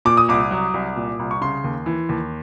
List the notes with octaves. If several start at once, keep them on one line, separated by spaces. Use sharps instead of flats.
A#2 D6
D#6
C2 D6
F#3
C2
A#2
C2
C#6
C#3 C6
D#2
E3
D#2